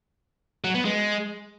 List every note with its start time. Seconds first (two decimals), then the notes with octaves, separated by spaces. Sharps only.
0.64 F#3
0.75 B3
0.85 G#3